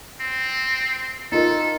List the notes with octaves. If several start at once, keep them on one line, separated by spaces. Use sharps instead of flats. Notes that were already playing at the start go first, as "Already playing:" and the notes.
C4
D#4 F4 A4 A#4